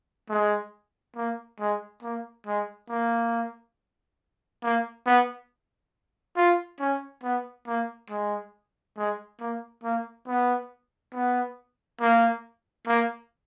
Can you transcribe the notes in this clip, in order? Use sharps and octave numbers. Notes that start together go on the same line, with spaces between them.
G#3
A#3
G#3
A#3
G#3
A#3
A#3
B3
F4
C#4
B3
A#3
G#3
G#3
A#3
A#3
B3
B3
A#3
A#3